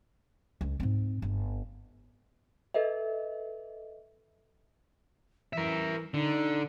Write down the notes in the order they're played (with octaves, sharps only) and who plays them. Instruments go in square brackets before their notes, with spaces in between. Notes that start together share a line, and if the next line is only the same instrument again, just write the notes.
[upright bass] C#2
G#2 C4
G1
[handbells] A4 B4 D#5 E5
[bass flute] E3 [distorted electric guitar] A#4 E5
[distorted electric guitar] D3 [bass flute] D#4